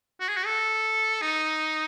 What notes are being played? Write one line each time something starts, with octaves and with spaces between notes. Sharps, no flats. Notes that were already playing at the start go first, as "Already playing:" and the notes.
F#4
G#4
F#4
A4
D#4